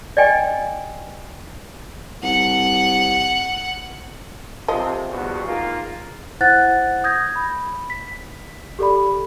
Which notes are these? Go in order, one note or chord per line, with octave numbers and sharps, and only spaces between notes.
D5 D#5 G5 G#5
C2 F#5
C3 F3 D#5
E2 G2 B2
G#2 A#3 F4
E4 C5 F#5 F#6 A6
D#6 G6 G#6 A#6
B5
B6
G4 A4 D5 B5